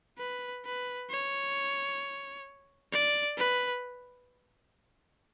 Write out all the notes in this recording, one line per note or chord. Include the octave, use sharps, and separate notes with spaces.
B4
B4
C#5
D5
B4